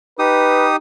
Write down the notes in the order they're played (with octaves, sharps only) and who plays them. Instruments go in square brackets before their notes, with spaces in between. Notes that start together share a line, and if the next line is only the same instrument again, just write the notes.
[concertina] D#4 G4 D#6 [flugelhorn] B4